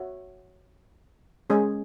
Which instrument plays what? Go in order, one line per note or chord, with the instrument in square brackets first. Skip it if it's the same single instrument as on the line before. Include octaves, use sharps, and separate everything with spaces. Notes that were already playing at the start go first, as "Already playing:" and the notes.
Already playing: [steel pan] F#4 C#5 E5
G#3 C#4 G#4 D#5